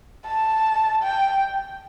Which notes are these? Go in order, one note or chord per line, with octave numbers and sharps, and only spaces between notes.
A5
G5